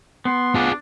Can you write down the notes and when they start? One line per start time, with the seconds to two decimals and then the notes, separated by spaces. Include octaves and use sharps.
0.25 B3 C6
0.55 D4 F4 G#4